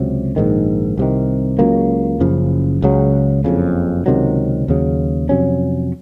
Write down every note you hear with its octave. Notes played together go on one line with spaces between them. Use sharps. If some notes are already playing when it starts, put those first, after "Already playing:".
Already playing: C#2 C3 F#3
A#1 G#2 D#3
C2 C3 D#3
C#2 C#3 F#3 A#3
F#1 F#2 C#3 F3
C#2 C#3 F#3
F#1 F2 C#3
C#2 C3 D#3 F#3
D#2 C#3 F#3
F2 C3 F#3 C#4